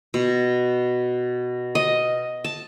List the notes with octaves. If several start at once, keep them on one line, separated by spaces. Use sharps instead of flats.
B2
D#5
A5